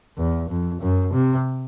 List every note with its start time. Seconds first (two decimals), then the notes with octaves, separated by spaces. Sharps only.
0.18 E2
0.50 F2
0.81 F#2
1.13 C3